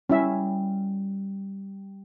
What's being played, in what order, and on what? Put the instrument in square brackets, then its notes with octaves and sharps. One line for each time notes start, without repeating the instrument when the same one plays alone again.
[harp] G3 [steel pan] C#4 E4 E5